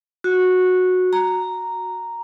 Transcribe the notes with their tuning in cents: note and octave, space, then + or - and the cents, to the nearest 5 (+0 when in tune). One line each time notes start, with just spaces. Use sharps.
F#4 -10
A#5 -5